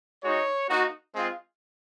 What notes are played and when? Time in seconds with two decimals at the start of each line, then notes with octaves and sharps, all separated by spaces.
0.23 G#3 D#4 F#4 C#5
0.69 A#3 D#4 F#4
1.13 G#3 C4 F4